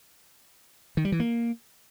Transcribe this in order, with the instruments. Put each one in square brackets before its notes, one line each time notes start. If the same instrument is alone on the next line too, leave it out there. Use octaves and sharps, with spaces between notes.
[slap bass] D#3
G3
E3
A#3